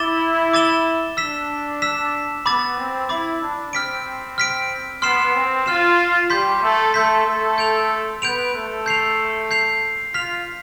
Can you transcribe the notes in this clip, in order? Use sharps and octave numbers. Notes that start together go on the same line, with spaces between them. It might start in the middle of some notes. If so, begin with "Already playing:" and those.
Already playing: E4 D6 A6 E7 G7
D6 A6 E7 G7
D4 E6 B6 E7
E6 B6 E7
B3 B5 D6 A6
C4
E4 B5 D6 A6
D4
C4 F6 B6 D7
F6 B6 D7
B3 C6 F6 C7 E7
C4
F4 C6 F6 C7 E7
G3 G4 C6 G6 B6
A3 A4
A3 A4 C6 G6 B6
A3 A4
G6 D7 F7
B3 B4 G6 D7 F7
A3 A4
G6 C7 F7
G6 C7 F7
F4 F6 B6 F7